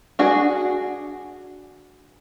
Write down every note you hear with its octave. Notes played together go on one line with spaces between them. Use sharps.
D4 F#4 G#4